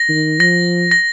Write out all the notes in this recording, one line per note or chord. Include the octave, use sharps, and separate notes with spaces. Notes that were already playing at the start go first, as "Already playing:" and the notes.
Already playing: A#6
D#3
F3 A#6
A#6